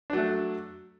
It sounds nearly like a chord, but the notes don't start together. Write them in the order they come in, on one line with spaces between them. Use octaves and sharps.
D4 F#3 A3